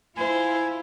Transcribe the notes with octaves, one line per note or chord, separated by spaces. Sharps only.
E4 F4 C5 G#5